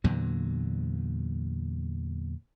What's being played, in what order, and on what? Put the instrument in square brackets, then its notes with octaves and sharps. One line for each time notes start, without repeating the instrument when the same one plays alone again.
[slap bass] E2 A#2 D3 F#3